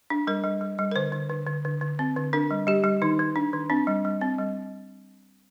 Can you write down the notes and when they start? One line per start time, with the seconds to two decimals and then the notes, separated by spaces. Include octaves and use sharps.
0.10 D4
0.27 G3 A#4
0.44 G3
0.61 G3
0.79 G3
0.91 A#4
0.96 D3 C5
1.12 D3
1.29 D3
1.47 D3
1.65 D3
1.81 D3
1.99 C4
2.16 D3
2.33 D4 A#4
2.51 G3
2.67 G3 G4
2.84 G3
3.02 D#3 D#4
3.19 D#3
3.36 D4
3.53 D#3
3.70 C4 D4
3.87 G3
4.05 G3
4.21 C4
4.38 G3